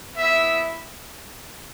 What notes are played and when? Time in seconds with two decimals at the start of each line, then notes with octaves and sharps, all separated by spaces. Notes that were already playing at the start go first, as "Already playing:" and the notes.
0.16 B3 E5
0.22 E4